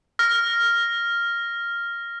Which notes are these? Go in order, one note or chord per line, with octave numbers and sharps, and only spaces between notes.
F6 A#6